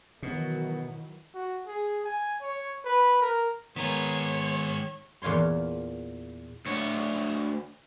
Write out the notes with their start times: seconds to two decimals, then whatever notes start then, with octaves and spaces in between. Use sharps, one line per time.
0.22 B2 D#3 E3 F#3
1.34 F#4
1.67 G#4
2.04 G#5
2.42 C#5
2.85 B4
3.22 A#4
3.76 D#3 G#3 B3 A#4 C#5
5.22 E2 A#2 F4 C#5 C6
6.67 D2 C#5